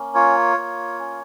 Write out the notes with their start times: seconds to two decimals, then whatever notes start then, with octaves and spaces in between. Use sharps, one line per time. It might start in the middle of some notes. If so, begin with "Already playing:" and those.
Already playing: A#3 C#4
0.15 F4 C#5
0.57 A#3
0.99 C#4